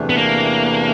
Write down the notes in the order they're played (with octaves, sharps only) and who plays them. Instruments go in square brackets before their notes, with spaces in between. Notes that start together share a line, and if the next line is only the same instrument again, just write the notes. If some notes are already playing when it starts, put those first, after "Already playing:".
Already playing: [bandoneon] E2 C3 E3 A3 D4
[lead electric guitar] B3
A#3